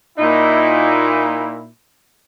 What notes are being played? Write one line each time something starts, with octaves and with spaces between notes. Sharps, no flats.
A#2 D#4 E4